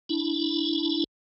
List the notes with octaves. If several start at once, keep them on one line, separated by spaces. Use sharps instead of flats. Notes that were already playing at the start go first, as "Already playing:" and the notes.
D4 E4